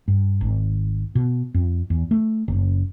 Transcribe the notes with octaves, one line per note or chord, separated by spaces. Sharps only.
G2
G#1
B2
F2
E2
A3
F#1